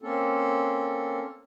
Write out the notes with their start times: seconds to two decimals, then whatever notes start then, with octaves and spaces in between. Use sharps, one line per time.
0.02 A#3 C4 C#4 A4